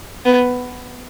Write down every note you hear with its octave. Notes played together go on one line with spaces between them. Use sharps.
B3